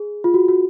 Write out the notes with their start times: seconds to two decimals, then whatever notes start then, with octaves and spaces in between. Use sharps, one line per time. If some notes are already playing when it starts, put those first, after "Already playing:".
Already playing: G#4
0.24 F4
0.34 F#4
0.48 F#4